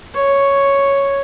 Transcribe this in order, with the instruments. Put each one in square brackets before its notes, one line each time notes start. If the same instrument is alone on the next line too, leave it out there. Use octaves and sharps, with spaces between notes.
[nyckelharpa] C#5